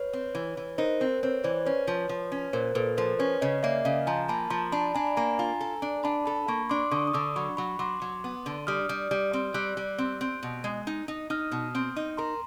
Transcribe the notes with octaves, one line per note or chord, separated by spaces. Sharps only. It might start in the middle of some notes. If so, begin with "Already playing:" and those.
Already playing: B4 C#5
C4
E3
E3
D#4 A#4 C5
C4 A#4 C5
C4 B4 C#5
E3 C5 D5
C#4 B4 C#5
F3
F3
C#4
A#2 A#4 C5
A#2 A4 B4
F3 A#4 C5
C#4 B4 C#5
C#3 C#5 D#5
A#3 D5 E5
C#3 D#5 F5
F3 G#5 A#5
A#3 A5 B5
F3 A#5 C6
D4 A5 B5
D4 G#5 A#5
B5
A#3 G#5 A#5
F4
A4
D4
D4 A5 B5
A4 A5 B5
A#3 B5 C#6
D4 C6 D6
D3 C#6 D#6
D#6
D3 D6 E6
F#3 B5 C#6
F#3 B5 C#6
F#3 C6 D6
F#3
B3
D3
G3 D#6 F6
G3
G3
C4
G3 E6 F#6
G3
C4
C4
B2
G#3
D#4
D#4
D#4 D#6 F6
B2
C4
D#4
A#4 A#5 C6